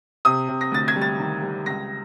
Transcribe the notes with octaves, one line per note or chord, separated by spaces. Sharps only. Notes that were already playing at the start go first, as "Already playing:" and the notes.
C3 D#6
C3
A#6
D2 A6
G#6
G3
A6
D#3
G3
C#2 A#6